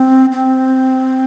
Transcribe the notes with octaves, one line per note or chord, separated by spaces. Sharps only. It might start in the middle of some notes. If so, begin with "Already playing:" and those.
Already playing: C4
C4